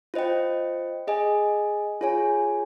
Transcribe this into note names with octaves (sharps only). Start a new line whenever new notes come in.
F4 C5 D#5 G5
G#4 D#5 G#5
F4 G#4 C#5 G#5